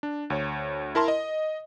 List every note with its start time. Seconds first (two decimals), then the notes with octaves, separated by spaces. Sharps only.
0.03 D4
0.30 D2 C#5
0.95 E4 A#4 A5 C6
1.08 D#5